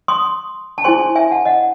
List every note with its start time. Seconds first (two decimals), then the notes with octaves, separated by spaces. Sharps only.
0.08 C6 D#6
0.78 A5
0.84 E4 G#4 C5 G#5 C6
1.15 E5 G#5
1.31 F#5 A5
1.45 D#5 F#5